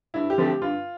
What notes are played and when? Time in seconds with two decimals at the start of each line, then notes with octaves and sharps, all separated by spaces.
0.14 G2 E4
0.30 G4
0.38 D3 F3 A3 C4
0.46 G4
0.61 G2 F4